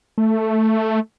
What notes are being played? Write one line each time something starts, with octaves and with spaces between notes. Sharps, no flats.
A3